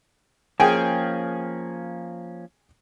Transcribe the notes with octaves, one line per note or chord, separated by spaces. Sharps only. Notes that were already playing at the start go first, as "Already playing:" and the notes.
F3 A#3 C#4 G#4 G5 G#5